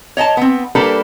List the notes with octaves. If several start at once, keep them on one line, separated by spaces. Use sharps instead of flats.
C#5 D#5 G#5 A5
B3 C4
G3 A#3 D4 G4 A4 B4